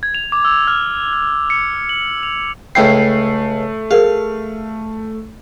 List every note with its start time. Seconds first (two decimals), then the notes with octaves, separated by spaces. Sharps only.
0.03 G#6
0.14 F7
0.32 D6
0.45 E6
0.67 F6
1.13 F6
1.50 C#7
1.89 F#7
2.23 F7
2.75 C#2 A3 E4 G5 C7
3.91 G#4 A#4 F5